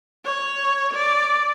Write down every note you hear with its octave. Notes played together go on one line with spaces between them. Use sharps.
C#5
D5